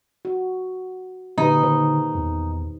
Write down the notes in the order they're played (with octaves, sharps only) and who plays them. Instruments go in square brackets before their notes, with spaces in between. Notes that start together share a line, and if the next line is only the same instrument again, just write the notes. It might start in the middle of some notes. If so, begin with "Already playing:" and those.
[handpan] F#4
[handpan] A#2 G4 B4 [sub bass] D3 [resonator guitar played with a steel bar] D#4
[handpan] D#3 C5
[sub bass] E2